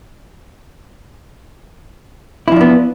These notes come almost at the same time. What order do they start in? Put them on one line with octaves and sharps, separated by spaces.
E4 F3 D4 B3